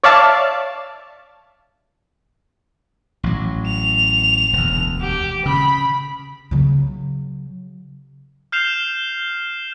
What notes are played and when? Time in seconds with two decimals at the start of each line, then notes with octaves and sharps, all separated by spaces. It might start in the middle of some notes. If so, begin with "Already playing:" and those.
0.04 C#5 D5 E5 F5 A5
3.23 A1 F#3
3.67 F7
4.53 E1 D2
5.01 G4
5.46 C#3 B5
6.51 C#3 F#3
8.52 F6 G6 C7 E7 F7 G7